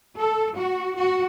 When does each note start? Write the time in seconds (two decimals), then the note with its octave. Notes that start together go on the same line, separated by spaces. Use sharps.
0.17 A4
0.56 F#4
0.96 F#4